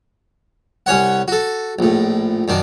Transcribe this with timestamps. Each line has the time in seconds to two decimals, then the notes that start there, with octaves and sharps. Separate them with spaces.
0.86 C2 C#4 C#5 F#5
1.28 F#4 A4
1.79 A#1 A2
2.48 F#2 D#3 D4